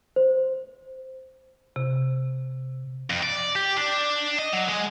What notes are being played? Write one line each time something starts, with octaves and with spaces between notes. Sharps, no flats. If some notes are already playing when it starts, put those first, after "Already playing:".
C5
C3
F2
D5
G4
D4
D#5
F#3
G#3